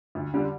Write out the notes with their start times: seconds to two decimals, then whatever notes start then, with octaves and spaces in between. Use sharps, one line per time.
0.15 D2
0.34 D3 G3